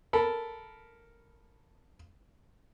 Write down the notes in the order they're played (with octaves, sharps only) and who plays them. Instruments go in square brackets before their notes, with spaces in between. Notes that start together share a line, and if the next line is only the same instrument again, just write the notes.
[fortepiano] A4 A#4 B5